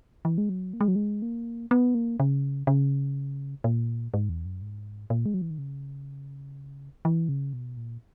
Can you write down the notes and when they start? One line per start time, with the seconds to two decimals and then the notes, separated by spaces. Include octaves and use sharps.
0.25 E3
0.38 G#3
0.49 F#3
0.73 A#3
0.81 G#3
0.88 F#3
0.96 G#3
1.22 A#3
1.71 B3
1.95 A#3
2.20 C#3
2.67 C#3
3.64 A#2
4.14 G#2
4.29 E2
4.45 F#2
4.62 G#2
5.10 A#2
5.26 G#3
5.34 F#3
5.42 E3
5.50 D#3
5.58 C#3
7.05 E3
7.29 C#3
7.53 B2
7.77 A#2